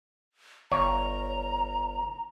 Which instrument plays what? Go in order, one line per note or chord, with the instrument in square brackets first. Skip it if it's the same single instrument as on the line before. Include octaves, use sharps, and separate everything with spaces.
[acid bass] G1 [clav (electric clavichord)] C#5 [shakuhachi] A#5